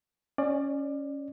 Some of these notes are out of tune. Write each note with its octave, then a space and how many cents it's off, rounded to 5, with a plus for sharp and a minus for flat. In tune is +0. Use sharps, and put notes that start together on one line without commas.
C#4 +0 D5 +25